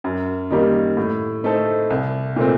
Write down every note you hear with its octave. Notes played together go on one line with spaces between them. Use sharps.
F#2
D#3 G3 A#3
A2
A3 D#4 A4 C5
C2
A#2 A3 C4